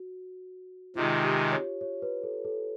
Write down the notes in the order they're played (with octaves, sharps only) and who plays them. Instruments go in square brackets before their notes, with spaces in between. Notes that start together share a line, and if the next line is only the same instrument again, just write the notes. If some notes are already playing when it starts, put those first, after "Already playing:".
Already playing: [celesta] F#4
[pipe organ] C3 D#3 G#3 [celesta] F4
[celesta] G4
C#5
C#5
B4
A4
A4